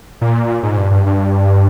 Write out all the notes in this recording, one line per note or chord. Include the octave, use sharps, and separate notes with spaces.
A#2
G#2
G2
G2
G2